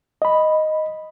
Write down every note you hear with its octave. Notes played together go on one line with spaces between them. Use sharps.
D#5 B5